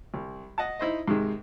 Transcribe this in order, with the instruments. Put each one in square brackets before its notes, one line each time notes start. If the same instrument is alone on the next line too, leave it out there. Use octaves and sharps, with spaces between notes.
[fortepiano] C2
D#5 F#5 A5
D#4 E4 C5 D#5
G#2 C3 D#3 G#3